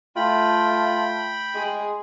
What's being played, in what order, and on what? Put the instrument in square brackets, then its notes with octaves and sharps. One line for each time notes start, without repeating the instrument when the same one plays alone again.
[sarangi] A3 [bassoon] F4 [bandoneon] G5 B5
[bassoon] G#3 [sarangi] G#4